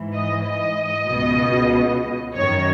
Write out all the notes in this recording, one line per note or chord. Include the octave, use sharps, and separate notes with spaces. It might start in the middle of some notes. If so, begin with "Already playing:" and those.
Already playing: G#2 E3
D#5
D#5
C#2 B2
F#2 D#3 C#5